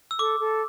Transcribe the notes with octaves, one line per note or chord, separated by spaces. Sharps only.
E6
A4 D6
A4